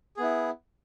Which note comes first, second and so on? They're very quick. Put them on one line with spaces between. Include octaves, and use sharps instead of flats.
G#4 B3 E4